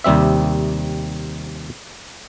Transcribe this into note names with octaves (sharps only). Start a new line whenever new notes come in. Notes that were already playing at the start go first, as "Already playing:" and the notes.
D#2 C3 G3 C4 E5